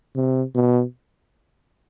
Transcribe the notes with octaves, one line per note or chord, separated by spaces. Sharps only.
C3
B2